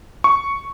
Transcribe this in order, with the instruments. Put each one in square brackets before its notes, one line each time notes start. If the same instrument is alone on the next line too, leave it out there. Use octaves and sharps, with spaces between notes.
[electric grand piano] C#6